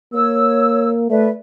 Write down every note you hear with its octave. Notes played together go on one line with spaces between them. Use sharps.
A#3 C#5 E6
A3 B4 D5 E5